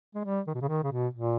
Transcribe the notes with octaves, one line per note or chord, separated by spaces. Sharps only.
G#3
G3
D#3
B2
C#3
D#3
C#3
B2
A#2